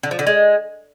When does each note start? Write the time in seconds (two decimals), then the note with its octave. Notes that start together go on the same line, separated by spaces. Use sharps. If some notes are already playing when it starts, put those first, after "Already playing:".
0.03 D3
0.11 F3
0.19 D3
0.27 G#3